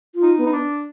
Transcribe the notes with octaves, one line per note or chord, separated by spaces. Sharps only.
F4
D#4
B3
D#4
D4